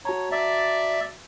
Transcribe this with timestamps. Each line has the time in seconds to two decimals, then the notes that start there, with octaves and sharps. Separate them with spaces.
0.05 F#4 C#5 A5 A#5
0.32 D5 E5